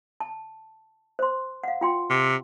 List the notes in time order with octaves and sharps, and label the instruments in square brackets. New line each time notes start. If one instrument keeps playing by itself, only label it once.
[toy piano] A5
C5 C6
F5 F#5
F4 G5 C6
[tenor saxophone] C3